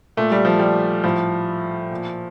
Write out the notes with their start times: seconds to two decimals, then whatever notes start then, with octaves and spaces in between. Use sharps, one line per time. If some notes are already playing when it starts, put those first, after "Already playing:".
0.17 A#2 A3
0.32 G3
0.45 F3
0.59 G3
1.04 A2 F3
1.91 A#2